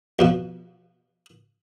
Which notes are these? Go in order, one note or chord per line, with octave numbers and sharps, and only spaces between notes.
F2 B2 F3